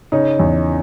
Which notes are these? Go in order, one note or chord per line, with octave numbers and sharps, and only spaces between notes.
C#3 C#4 D#4
E2